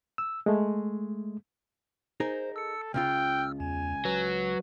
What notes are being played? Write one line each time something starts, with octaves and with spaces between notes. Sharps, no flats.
E6
G#3 A3
D#4 G#4 A#4 C5
A4 E6 C#7
C#2 C#3 F4 G5 E6 F6
E2 G#5
F#3 B4